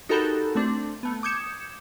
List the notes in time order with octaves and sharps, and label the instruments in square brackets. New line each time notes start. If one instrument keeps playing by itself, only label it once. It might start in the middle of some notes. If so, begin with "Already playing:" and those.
[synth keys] D#4 F#4 G4 A4 A#4 B5
A3 C4 D4
A3 B3
D6 D#6 G6 G#6 C#7 E7